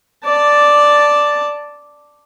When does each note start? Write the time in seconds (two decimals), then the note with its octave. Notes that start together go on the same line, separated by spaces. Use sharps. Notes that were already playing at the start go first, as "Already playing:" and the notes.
0.25 D5 A5